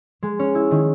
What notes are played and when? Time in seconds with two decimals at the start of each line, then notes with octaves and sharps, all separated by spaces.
0.23 G#3
0.39 C#4
0.55 E4
0.71 D#3